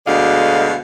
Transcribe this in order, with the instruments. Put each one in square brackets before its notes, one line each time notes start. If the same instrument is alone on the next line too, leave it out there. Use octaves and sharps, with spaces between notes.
[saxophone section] D2 B2 D3 G#3 F5